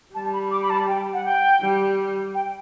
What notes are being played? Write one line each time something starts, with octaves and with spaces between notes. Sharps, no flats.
G3 A5
B5
D6
B5
A5
G5
F#5
G5
G3
G5